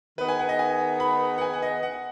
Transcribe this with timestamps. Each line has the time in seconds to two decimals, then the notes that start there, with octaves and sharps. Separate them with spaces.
0.18 D#3 B3 D#4 G#4 B4
0.28 G#5
0.39 F#5
0.49 D#5
0.59 G#5
1.00 B5
1.38 F#5
1.41 G#5
1.53 F#5
1.62 D#5
1.83 F#5